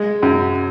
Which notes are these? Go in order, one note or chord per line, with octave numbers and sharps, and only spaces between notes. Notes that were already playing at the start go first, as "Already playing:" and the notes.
Already playing: G#3
F#2